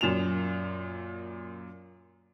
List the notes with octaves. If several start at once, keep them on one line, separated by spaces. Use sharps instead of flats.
F#2 A#2 E7 F7